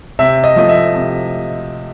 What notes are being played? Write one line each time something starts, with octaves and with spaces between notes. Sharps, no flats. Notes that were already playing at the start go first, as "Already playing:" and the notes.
C3 E5
D#5
F3 A3 D#5
E5
C3